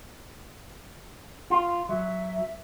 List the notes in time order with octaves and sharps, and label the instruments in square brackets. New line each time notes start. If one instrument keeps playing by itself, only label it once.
[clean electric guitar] F4
[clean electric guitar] F#3 [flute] E5